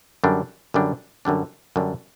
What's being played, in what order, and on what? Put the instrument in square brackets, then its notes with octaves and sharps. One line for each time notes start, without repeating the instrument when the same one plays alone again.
[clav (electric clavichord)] F#2 D3 G3 D4
F#2 D3 G3 D4
F#2 D3 G3 D4
F#2 D3 G3 D4